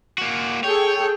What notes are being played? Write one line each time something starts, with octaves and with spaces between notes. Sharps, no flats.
A#3 F#4
G#4 A4 C#5 G5